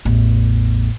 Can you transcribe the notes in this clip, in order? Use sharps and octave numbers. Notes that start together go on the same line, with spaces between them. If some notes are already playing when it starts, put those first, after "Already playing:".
A1 E2